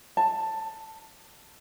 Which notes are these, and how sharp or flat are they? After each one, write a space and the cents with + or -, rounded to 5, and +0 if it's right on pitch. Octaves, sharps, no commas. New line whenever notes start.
A5 +10